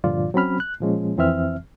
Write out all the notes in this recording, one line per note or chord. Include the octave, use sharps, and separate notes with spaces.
G2 A#2 D3 F3 F4 D5
F#3 C4 C#4 B5 F6
F#6
A#2 F3 G#3 C#4
F2 E3 C4 E5 F6